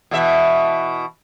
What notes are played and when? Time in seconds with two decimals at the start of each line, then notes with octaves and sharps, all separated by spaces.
0.11 B2 E3 E5